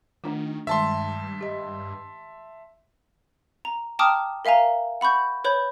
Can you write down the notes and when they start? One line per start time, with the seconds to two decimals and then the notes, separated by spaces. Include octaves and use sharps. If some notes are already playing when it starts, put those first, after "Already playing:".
0.24 D#3 A3 D4 F4
0.67 G2 D#3 G#3 E5 A5 C6
1.41 G4 D#5
3.65 A#5
3.99 G5 A5 A#5 D6 D#6 F6
4.45 A#4 E5 F5 G#5 A#5
5.01 F#5 B5 C#6 G6
5.44 B4 C#5 B5 G6